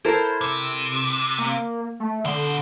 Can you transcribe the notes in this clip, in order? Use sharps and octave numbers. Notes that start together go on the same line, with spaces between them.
E4 A4 A#4 C5
C3 E6
A#3
A3
B2 D3 C5